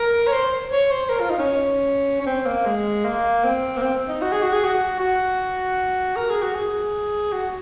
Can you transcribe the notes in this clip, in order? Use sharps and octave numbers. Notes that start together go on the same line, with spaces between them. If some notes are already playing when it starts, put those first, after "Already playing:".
Already playing: A#4
C#5
C5
C#5
C5
A#4
F4
D#4
C#4
C#4
C4
A#3
G#3
A#3
C4
A#3
C4
D#4
F#4
G#4
F#4
G#4
F#4
F#4
A#4
G#4
F#4
G#4
F#4